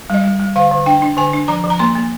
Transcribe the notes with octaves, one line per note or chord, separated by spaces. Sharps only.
G3 D#5
G3
G3
D3 F5
D3
D4 G5
D4
D3 G#5
D4
F3 A#5
F3
A#5
A#3 C6
A#3